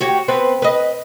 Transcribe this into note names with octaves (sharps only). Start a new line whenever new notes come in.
F#4 G4 C#5
B3 C4 B4
B4 D#5